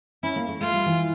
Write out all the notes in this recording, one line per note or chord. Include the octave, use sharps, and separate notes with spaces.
C#4 E4
A#3
A3
A3 F4
G3
E3